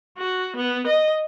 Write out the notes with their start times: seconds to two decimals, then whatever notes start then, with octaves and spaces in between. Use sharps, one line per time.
0.18 F#4
0.56 B3
0.87 D#5